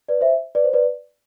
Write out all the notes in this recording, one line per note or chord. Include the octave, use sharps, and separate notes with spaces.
B4 D5
C5 E5
B4 D5
C5
B4 D5